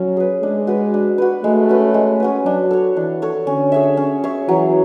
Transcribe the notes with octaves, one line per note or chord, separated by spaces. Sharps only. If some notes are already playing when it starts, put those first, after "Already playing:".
Already playing: F#3 C#4
G#4 B4
G#3 D4
F#4 B4
D4
F#4 B4
G#3 A3
C#4 F#4 B4
G#3
C#4 F#4 B4
F#3 D4
A4 C#5
E3 D4
A4 C#5
D3 C#4
G#4 C#5 E5
C#4
G#4 C#5 E5
E3 F#3